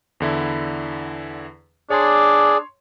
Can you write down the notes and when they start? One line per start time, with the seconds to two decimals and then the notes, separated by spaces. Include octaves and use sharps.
0.20 E2 D3 E4
1.90 D4 G#4 C#5 D5 C6